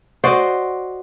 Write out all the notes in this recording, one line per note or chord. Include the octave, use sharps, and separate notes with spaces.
F#4 C5 D5 D#5